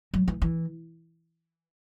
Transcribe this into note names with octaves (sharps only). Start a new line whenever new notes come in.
F#3
E3
E3